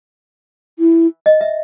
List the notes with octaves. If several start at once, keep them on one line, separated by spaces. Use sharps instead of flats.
E4
D#5
E5